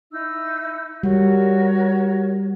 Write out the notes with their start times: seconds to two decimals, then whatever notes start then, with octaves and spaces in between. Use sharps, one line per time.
0.12 D#4 E4 E6
1.03 G3 F#4 A#4 C#5